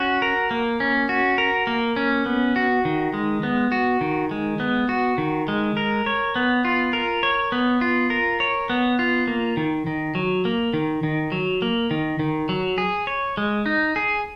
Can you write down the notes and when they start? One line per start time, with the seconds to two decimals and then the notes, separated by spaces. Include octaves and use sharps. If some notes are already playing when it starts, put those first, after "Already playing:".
Already playing: C#4 F#4
0.22 A#4
0.51 A#3
0.80 C#4
1.09 F#4
1.38 A#4
1.67 A#3
1.96 C#4
2.26 B3
2.56 F#4
2.85 D#3
3.14 G#3
3.43 B3
3.72 F#4
4.01 D#3
4.31 G#3
4.60 B3
4.89 F#4
5.18 D#3
5.48 G#3
5.77 A#4
6.06 C#5
6.36 B3
6.65 F4
6.93 A#4
7.23 C#5
7.52 B3
7.81 F4
8.10 A#4
8.40 C#5
8.70 B3
8.99 F4
9.27 A#3
9.57 D#3
9.87 D#3
10.15 F#3
10.45 A#3
10.74 D#3
11.03 D#3
11.32 F#3
11.62 A#3
11.91 D#3
12.19 D#3
12.49 F#3
12.78 G#4
13.07 C#5
13.37 G#3
13.66 D#4
13.96 G#4